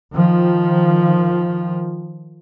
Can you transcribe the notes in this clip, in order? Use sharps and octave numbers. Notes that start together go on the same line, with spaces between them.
D#3 F3